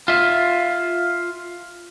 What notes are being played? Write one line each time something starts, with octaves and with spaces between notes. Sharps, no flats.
F4 E5